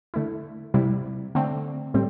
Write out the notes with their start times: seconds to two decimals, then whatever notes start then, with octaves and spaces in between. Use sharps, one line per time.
0.14 D3 A3 E4
0.74 C3 G3 E4
1.35 D3 A3 C4
1.94 A2 G3 C4